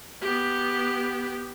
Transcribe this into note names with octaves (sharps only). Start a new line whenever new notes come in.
B3 G4